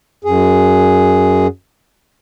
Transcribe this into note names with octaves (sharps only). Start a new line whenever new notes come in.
F#2 G#4